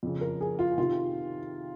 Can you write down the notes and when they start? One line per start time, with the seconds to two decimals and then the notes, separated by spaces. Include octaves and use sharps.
0.03 F2 C#3
0.21 A#4
0.41 G#4
0.59 F4
0.78 C3 D#3 F4